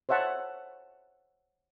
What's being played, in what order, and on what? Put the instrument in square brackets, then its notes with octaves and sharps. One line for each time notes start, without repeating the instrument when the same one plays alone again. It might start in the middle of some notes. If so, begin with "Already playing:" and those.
[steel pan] C5 C#5 E5 F#5 A5